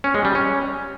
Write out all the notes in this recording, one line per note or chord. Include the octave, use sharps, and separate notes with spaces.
C#4
G#3
G3
C#4